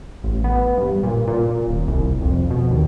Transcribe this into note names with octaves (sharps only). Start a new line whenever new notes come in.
A1
B3
G2
A#2
A#2
D#1
C2
F2
B2
D#2